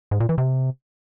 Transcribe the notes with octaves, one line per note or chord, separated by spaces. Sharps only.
G#2
A#2
E3
C3